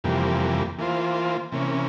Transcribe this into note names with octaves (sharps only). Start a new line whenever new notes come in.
F2 C3 E3 G3 A#3
E3 A#3 F4 C5
C3 E3 A#3 C#4